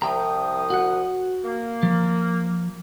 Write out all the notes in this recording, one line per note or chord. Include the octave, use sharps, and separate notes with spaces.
C2 F3 E5 G5 A#5 D#6
F#4 F#5
A#3
F3